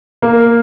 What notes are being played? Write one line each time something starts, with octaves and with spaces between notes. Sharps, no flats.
A#3